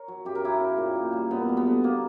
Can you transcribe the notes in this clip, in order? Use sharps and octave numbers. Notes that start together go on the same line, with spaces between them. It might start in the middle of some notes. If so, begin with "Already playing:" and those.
Already playing: A#4 C#5
F#3
F#2 G4
A#4
F#3 E4 G4
C#3
A#2
A#2
G3
F#2 B3
G3
B3
D3
B2 A#3